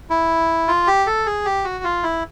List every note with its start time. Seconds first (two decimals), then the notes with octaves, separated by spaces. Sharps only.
0.10 E4
0.68 F4
0.87 G4
1.07 A4
1.26 G#4
1.45 G4
1.65 F#4
1.84 F4
2.03 E4